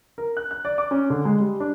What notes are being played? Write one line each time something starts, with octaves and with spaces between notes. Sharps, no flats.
A#4
F#6
F#6
D5
D6
C#4
D3
G#3
G3
D4